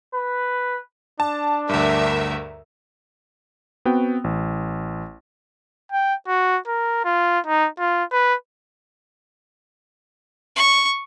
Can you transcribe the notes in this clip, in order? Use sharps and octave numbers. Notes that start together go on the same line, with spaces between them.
B4
D4 A5
D2 G2 A#4 E5
B3 C4 F#4 G5
A1
G5
F#4
A#4
F4
D#4
F4
B4
C#6